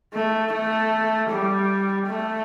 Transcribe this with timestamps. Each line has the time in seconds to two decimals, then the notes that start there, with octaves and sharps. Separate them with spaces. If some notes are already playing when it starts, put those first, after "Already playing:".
0.14 A3
0.52 A3
1.29 G3
2.07 A3